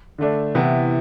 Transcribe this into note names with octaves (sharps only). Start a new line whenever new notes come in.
D3 A3 D4
C3 E3 B3 E4